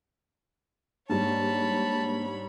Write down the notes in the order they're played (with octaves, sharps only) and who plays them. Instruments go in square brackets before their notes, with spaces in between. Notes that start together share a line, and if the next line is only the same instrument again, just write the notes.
[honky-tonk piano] G#2 G3 [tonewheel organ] A#3 D4 [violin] C#5 B5 [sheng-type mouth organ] A5